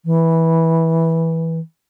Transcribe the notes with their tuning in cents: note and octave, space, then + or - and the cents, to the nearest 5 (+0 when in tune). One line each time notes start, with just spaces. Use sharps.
E3 -10